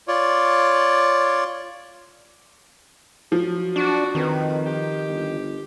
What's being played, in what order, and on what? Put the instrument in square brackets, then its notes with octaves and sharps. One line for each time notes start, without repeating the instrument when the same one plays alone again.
[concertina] F4 C#5 D5
[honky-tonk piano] F3 [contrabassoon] F#3
[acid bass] D4 [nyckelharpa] F#4 D5
[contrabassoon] F2 [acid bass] D#3 [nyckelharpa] B4
[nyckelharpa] G4
[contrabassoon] G1